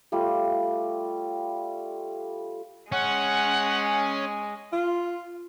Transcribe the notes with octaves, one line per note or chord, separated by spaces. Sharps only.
G3 A3 F4
G#3 C#4 F#5
F4